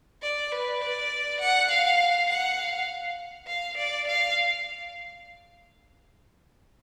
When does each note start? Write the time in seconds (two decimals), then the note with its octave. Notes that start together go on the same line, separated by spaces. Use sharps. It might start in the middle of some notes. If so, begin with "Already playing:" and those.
0.22 D5
0.52 B4
0.81 D5
1.40 F#5
1.70 F5
2.29 F#5
2.59 F5
3.47 F5
3.77 D5
4.07 F5